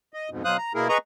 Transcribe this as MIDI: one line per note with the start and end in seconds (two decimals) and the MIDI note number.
0.13 0.30 75
0.30 0.43 41
0.30 0.43 44
0.30 0.43 47
0.45 0.57 47
0.45 0.57 54
0.45 0.57 72
0.45 0.57 77
0.45 0.57 87
0.45 0.57 90
0.58 0.73 82
0.74 0.88 47
0.74 0.88 58
0.74 0.88 64
0.74 0.88 68
0.74 0.88 70
0.89 0.98 68
0.89 0.98 71
0.89 0.98 75
0.89 0.98 82
0.89 0.98 85